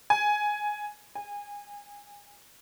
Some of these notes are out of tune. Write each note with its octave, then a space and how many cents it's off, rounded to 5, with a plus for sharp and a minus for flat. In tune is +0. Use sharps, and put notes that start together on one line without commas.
G#5 +10
G#5 -20